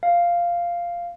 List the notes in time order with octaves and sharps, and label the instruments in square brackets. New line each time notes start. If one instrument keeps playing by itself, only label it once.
[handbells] F5